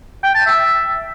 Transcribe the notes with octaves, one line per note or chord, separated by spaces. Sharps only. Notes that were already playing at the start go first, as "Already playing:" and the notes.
G5
A5
E5